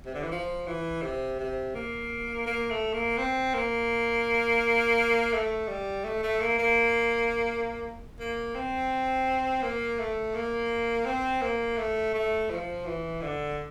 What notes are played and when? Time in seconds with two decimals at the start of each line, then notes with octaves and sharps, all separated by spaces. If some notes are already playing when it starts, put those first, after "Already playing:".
0.06 C3
0.14 D3
0.23 E3
0.31 F3
0.67 E3
1.02 C3
1.39 C3
1.75 A#3
2.46 A#3
2.71 A3
2.93 A#3
3.18 C4
3.54 A#3
5.33 A3
5.68 G3
6.04 A3
6.23 A3
6.41 A#3
6.59 A#3
8.20 A#3
8.55 C4
9.63 A#3
9.99 A3
10.35 A#3
11.06 C4
11.42 A#3
11.78 A3
12.14 A3
12.50 F3
12.86 E3
13.22 D3